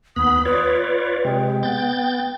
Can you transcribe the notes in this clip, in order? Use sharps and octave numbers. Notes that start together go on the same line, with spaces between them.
D#2 B3 B5 D#6
F4 B4 C#5 D5
C3 G#3 G5
B3 G6 A6